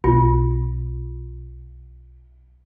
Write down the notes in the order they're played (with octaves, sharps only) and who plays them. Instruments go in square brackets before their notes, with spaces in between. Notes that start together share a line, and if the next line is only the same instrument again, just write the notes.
[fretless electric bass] B1 [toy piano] F4